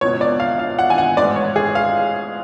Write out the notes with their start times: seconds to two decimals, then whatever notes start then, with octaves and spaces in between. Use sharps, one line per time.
0.01 C#2 B2 C#5
0.21 D5
0.40 F5
0.59 F5
0.79 F#5
0.90 G#5
0.98 F#5
1.17 A1 G#2 D5
1.36 C#5
1.56 G#4
1.75 F5